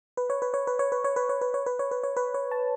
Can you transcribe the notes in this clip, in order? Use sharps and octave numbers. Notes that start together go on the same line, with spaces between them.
B4
C#5
B4
C#5
B4
C#5
B4
C#5
B4
C#5
B4
C#5
B4
C#5
B4
C#5
B4
C#5
A5